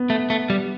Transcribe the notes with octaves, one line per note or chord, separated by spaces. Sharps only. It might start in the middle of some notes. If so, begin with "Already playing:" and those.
Already playing: B3
A3
A3
G3